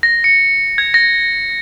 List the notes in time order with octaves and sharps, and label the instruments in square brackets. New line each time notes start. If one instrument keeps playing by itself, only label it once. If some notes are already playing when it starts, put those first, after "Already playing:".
[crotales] A#6
C#7
G#6
A#6